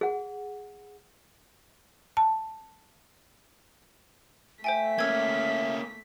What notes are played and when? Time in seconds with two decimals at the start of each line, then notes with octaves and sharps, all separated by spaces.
0.01 G#4 F#5
2.17 A5
4.64 A3 C5 E5 G5 G#5 B6
4.99 A#3 C#4 E6 G#6